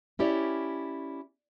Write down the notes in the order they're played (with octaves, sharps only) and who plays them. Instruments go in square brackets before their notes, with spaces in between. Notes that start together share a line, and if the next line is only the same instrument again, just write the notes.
[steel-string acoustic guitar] C#4 E4 G4 C#5 D5